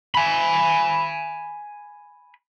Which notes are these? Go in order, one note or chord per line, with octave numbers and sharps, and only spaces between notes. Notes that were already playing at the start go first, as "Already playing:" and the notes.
G#5 B5